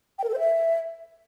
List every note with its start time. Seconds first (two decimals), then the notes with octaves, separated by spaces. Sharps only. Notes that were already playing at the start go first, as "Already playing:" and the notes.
0.19 G5
0.24 A#4
0.29 A4
0.34 C5
0.39 E5